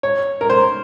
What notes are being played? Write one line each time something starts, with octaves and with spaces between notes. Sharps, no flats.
C#5
A#4
C5